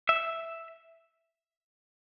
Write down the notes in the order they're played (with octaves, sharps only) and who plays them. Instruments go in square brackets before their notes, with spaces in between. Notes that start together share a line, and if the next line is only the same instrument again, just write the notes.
[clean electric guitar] E5